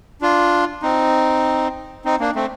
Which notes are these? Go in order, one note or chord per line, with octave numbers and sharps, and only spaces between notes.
D4 F4
C4 D#4
C4 D#4
A#3 D4
A3 C4